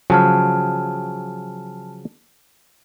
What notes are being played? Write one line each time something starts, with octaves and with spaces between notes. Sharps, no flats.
C#3 F3 F#3 G#5 A5 F6